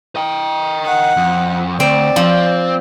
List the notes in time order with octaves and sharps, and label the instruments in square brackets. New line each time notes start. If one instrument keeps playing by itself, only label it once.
[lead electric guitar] D#5 G5
[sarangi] F#5
[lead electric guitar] F2
[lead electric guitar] D2 [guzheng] C4 [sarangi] D5
[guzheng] F3 [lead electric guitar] C4 C5